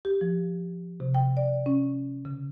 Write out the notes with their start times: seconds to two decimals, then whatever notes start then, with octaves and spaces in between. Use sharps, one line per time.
0.05 G4
0.21 F3
1.00 C3
1.15 G5
1.37 D5
1.66 C#4
2.25 C#3